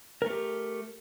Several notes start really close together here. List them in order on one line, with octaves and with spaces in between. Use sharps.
A#4 A3 G4